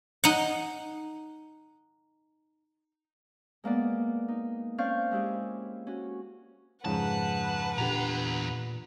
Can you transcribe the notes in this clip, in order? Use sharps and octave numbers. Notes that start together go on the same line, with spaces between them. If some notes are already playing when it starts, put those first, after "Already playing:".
D#4 F#5
G#3 A#3 B3 D5
D#4
C4 C#4 D5 F5 C#6 G6
G#3 E4 G4 G#4
C#4 F#4
F2 G#2 C#3 B4 F#5 A5
E2 A#2 D3 G4 A#5 F7